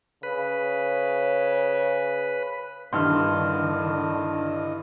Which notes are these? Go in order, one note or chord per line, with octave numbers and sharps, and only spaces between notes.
C#3 B4
G2 D3 D#3 D4 E4 D#5 C6 F6